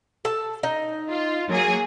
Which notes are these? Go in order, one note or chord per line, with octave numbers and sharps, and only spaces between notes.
A4 A5
D#4
F4
F#3 A#3 G#4